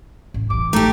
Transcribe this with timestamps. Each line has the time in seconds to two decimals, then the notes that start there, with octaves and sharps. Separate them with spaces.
0.34 A1
0.50 A1 E3 D6
0.73 A3 D#4 G4